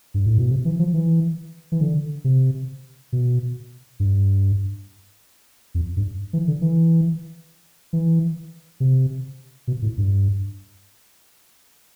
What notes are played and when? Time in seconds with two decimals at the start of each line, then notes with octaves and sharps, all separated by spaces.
0.14 G2
0.26 A2
0.38 B2
0.50 C3
0.65 E3
0.79 F3
0.94 E3
1.72 E3
1.81 D3
2.24 C3
3.13 B2
4.00 G2
5.75 F2
5.97 G2
6.33 E3
6.48 D3
6.61 E3
7.93 E3
8.80 C3
9.67 B2
9.82 A2
9.98 G2